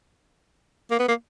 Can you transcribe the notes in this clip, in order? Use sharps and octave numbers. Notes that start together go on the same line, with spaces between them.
A#3
B3
A#3